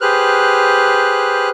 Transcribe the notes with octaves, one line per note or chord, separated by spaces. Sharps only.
G4 G#4 B4 C5 F6 F#6